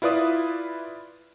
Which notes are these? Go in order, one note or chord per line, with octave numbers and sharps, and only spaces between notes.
E4 F4 B4 D5 D#6